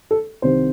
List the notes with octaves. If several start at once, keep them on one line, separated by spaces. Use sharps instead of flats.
A4
C2 C3 D#3 C5